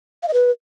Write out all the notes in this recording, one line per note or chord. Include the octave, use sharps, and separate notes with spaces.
F5
D#5
B4